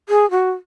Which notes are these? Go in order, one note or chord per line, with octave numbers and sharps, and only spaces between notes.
G#4
F#4